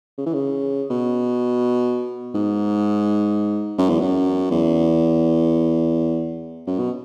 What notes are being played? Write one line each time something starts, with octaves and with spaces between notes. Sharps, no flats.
C#3
E3
C#3
B2
G#2
F#2
E2
F#2
E2
F#2
B2